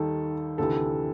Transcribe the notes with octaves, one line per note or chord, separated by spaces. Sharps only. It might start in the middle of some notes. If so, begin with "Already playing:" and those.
Already playing: D#2 D#3 G3 A4
D2 C3 E3 A4